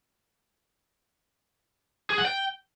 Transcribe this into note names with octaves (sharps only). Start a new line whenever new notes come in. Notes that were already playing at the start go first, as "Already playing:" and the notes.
G#4
F#5
G5